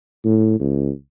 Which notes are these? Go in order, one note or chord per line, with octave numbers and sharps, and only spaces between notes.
A2
C#2